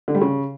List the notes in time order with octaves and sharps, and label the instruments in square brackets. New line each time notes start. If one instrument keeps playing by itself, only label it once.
[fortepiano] D3
G3
C#3